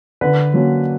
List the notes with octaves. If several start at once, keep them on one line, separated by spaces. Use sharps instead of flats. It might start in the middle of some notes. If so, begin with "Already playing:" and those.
D3 B4
F#3 A#3 C#4